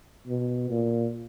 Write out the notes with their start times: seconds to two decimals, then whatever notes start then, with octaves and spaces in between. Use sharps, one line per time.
0.27 B2
0.70 A#2